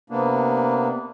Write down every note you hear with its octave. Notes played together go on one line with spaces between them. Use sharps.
C3 A#3 B3 D4